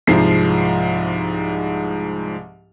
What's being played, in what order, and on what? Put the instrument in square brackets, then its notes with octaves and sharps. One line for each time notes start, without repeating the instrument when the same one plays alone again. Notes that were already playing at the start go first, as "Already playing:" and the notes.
[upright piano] C2 G#2 F3 C7